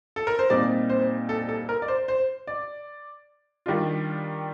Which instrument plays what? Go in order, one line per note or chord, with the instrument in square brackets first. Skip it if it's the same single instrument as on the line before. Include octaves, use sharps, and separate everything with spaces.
[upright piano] A4
A#4
C5
A#2 G3 C4 D#4 D5
C5
A4
A4
A#4
D5
C5
C5
D5
D#3 G3 D4 F4